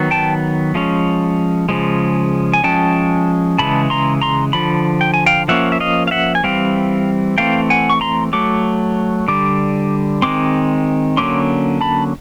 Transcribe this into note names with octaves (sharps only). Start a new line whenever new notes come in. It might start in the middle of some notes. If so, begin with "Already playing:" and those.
Already playing: D#3 F#3 B3
G5 A5
F3 G#3 C#4
C#3 F3 G#3
G#5
F3 G#3 C#4 G5 A5
C#3 E3 G#3 A5 B5
A#5 C6
A#5 C6
D3 F3 B5
G5
G#5
F5 G5
F3 A#3 C#4 E5 F#5
E5
D#5 F5
F5
E5 F#5
G#5
E3 G3 C4 F5 G5
E3 A3 C4 F5 G5
F#5 G#5
C#6
A#5 C6
F#3 A3 D6
D3 G3 D6
D#3 G#3 C4 C6 D6
D3 F#3 A#3 C#4 C6 D6
A5 B5